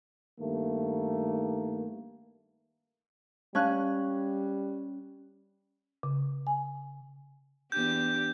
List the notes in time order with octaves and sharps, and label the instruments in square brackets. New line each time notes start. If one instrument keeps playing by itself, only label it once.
[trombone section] G2 D#3 A3 A#3
[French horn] G3 [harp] C#4 F#6 [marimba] F5 A5
[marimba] C#3
G#5
[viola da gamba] E2 D4 G4 [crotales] G6